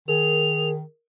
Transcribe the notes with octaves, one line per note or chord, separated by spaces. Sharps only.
D#3 G#4 A#4 F7